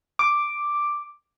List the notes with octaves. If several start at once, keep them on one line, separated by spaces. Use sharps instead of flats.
D6